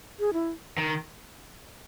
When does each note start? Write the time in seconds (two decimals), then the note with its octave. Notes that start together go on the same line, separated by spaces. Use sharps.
0.20 G#4
0.33 E4
0.78 D#3